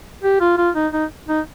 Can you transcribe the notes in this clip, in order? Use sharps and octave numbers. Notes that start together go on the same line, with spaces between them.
G4
F4
F4
D#4
D#4
D#4